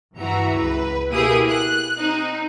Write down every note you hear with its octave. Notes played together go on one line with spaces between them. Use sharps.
G2 E3 F#4 A#5
C#2 B4
B2 A#3 E4 G4 G#4 D#6
F#6
C4 D#4